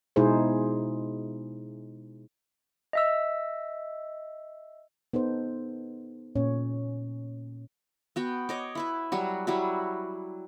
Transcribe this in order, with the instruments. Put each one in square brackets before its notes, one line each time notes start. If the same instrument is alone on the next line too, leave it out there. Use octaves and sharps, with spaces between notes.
[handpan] B2 G#3 D#4 E4 G#4 C5
[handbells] D#5 E5 E6
[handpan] B3 D#4 A4 C5
A#2 C#4 C#5
[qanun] B3 F#4 G5
C#5 D#5 D6
E4 B4 E5
F#3 G3 F#4
F#3 G3 E4 F#4